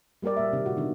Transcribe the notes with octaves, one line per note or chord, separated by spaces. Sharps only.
G3 A#3 G4 A#4 D5
A#2 A#3 E5
C3 D#3
A#2 F#4
D3 E3 A#3 B3 D#4